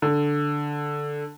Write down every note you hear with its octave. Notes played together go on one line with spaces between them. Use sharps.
D3